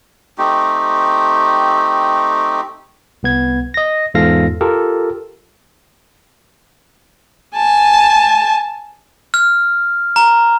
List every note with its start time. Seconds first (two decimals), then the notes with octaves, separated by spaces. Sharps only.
0.38 A3 C4 D#4 G4
3.23 C2 B3 G#6
3.74 D#5 A#6
4.14 E2 G#2 F4 A4 F5 A#6
4.61 F4 G4 A4 A#4
7.55 G#5 A5
9.34 F6
10.16 A#5